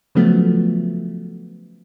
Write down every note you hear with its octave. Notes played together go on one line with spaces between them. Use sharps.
C#3 F3 F#3 A3 B3